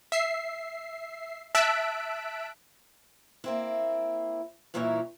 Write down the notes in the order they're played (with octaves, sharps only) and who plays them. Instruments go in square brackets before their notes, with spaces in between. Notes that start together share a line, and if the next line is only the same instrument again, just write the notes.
[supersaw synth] E5 C7
E5 A5 E6 F#6 B6 D7
[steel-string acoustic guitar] A#3 C4 E4
G2 A#2 E3 D#4 E4 C#5